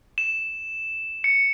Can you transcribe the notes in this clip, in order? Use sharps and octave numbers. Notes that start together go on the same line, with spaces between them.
E7
C#7